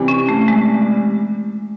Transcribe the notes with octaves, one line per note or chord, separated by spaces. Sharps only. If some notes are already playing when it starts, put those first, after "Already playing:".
Already playing: C3 E3 G3
C#4
A3
G#3